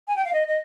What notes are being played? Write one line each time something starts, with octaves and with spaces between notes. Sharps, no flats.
G#5
G5
F5
D#5
D#5